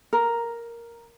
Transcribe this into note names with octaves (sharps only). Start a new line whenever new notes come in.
A#4